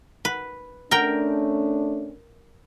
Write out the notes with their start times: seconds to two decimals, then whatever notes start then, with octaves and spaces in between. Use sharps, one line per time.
0.25 B4
0.91 A3 C#4 D4 A#4 G5